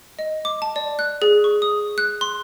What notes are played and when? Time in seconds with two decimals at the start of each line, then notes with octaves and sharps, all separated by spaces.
0.19 D#5
0.45 D6
0.62 A5
0.76 D5
0.99 F#6
1.22 G#4
1.44 C#6
1.62 D#6
1.98 F#6
2.21 C6